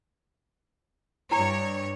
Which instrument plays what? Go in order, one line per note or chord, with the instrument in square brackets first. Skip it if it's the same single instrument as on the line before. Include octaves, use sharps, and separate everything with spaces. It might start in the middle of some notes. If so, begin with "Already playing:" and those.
[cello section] G2 C#5 [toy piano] E4 G#5 A#5